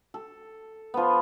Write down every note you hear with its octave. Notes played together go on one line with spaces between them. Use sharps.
A4
F3 B3